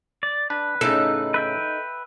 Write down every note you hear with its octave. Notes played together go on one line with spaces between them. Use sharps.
D5
D4 B4
A2 C#3 D#4 A4
B4 E5 G5